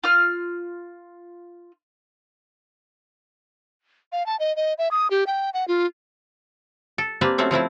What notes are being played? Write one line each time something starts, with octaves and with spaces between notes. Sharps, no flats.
F4 F6
F5
A5
D#5
D#5
E5
D#6
G4
G5
F#5
F4
A4
A#3 C4 D4 G4 B4
F#3 A3 C4 C#4
F3 A3 C4 E4